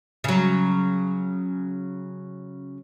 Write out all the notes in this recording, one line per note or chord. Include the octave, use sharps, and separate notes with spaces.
C#3 F#3